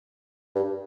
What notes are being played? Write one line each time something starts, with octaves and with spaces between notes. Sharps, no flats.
G2